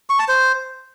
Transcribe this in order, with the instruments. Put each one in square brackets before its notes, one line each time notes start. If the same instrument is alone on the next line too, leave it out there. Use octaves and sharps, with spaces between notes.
[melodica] C#6
A5
C5